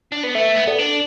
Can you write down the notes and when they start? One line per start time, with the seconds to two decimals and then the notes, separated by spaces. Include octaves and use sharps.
0.12 D4
0.24 B3
0.35 A3 B4 E5
0.57 B3
0.67 B3 A4 D5
0.79 D4